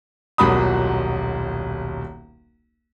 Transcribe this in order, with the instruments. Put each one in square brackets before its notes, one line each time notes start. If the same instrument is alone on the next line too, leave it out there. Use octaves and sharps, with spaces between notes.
[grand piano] D#1 B1 A#2 F#4 B5 D#6